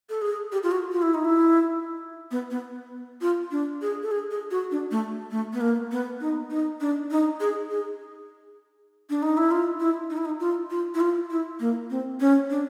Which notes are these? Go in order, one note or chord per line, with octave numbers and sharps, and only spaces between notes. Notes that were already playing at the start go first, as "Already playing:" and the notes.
A4
G#4
G4
F4
F#4
F4
E4
D#4
E4
B3
B3
F4
D4
G#4
A4
G#4
G#4
F#4
D4
A3
A3
B3
A#3
B3
D#4
D#4
D4
D#4
G#4
G#4
D4
D#4
E4
F4
E4
D#4
E4
D#4
F4
F4
E4
F4
E4
A#3
C4
C#4
D4